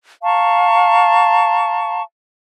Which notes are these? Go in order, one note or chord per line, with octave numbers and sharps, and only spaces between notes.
F5 A5 A#5 C#6